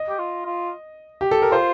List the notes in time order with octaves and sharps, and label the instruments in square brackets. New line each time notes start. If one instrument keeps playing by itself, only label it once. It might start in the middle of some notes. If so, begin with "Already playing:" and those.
Already playing: [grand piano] D#5
[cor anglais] G4
F4
F4
[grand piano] G4
A4
A#4
[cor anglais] F4 [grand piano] C5